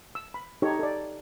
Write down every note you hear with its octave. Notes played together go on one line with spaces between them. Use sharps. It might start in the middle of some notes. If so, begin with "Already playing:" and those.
E6
B5
D#4 G4 A4 C#5
A4 D5